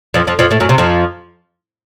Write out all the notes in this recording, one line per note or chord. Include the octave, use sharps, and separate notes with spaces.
F2 F3
F2 F3
F2 F3
A2 A3
F#2 F#3
C3
F2 F3